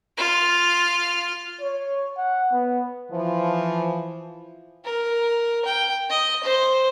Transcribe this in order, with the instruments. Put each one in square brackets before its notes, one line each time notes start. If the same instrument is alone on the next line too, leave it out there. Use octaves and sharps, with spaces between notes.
[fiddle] F4 F6
[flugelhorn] C#5
F#5
B3
[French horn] E3 [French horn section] F3
[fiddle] A#4
G5
D#5
C5